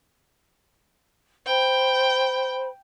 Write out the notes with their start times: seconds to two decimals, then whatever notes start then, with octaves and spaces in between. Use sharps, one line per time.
1.46 C5 G5 B5